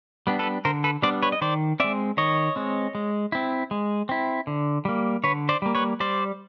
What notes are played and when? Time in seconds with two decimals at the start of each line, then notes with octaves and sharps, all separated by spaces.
0.27 G3 B3 D4
0.39 A4 B4
0.65 D3 A#4 C5
0.84 A4 B4
1.02 G3 B3 D4 C5 D5
1.22 B4 C#5
1.32 D#5
1.41 D#3 C5 D5
1.80 G#3 C4 D5 E5
2.17 D#3 C#5 D#5
2.56 G#3 C4
2.95 G#3
3.32 C4 E4
3.71 G#3
4.09 C4 E4
4.47 D3
4.85 G3 A#3
5.23 D3 B4 C#5
5.49 C5 D5
5.62 G3 A#3
5.75 B4 C#5
6.00 G3 C5 D5